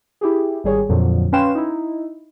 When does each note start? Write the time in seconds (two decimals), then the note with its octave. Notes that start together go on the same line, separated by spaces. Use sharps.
0.21 E4 G4 G#4
0.64 G#1 G3 G#4 C#5
0.89 F2 A#2 D3 F3 F#3
1.32 C#4 B4 F5 G5 C6 E7
1.55 D#4 E4